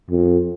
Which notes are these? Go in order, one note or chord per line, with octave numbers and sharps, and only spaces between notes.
F2